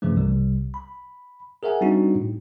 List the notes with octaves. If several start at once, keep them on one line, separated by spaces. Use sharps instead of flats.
G2 C#3 E3 F3 A3
C2 C3 G3
B5
G#4 A#4 E5 F#5 G#5
G3 C4 D4 D#4 F#4
A2